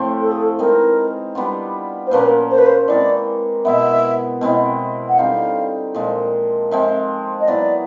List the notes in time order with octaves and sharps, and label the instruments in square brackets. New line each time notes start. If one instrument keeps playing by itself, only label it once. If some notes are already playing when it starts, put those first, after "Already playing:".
Already playing: [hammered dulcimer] A2 F3 A3 C4
[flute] A4
G#4
A4
[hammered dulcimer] E3 G#3 C4 D#4 [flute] A#4
[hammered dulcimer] G3 B3 D4 F4
[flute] C5
[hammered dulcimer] A#2 F3 A#3 C#4 [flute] B4
[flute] C5
B4
C5
[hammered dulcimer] E3 G#3 C4 [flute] D5
[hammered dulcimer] B2 G#3 B3 [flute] E5
[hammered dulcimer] B2 G#3 C4 E4
[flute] F#5
[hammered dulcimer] D3 G3 C4 D#4 [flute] F5
[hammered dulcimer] A#2 F3 G#3
[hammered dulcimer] F3 G#3 C4 [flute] E5
[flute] D#5
[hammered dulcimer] F#3 B3 E4 G#4 [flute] D5